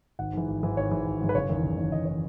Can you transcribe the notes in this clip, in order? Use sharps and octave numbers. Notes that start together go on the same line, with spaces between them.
G#1 F#5
G#2 E3
G#1
G#2 E3
G#1 C#5
G#2 E3
G#1
G#2 E3
B4
F#1 C#5
E2 D#3
F#1
E2 D#3
F#1 D#5
D#3 C#5